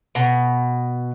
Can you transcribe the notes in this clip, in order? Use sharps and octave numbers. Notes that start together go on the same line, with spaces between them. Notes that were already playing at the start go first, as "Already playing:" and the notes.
B2